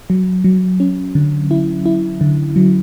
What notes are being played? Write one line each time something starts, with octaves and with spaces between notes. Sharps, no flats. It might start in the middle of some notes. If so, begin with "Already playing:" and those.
F#3
F#3
C#4
D3
E4
E4
D3
F#3